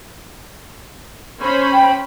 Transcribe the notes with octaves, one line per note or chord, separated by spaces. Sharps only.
C#4 C5 B5
G5